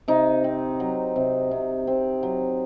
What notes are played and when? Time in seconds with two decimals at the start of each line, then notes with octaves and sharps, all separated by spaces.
0.08 C3 D#4
0.44 C4
0.80 F#3
1.16 C3
1.51 C3
1.87 C4
2.23 F#3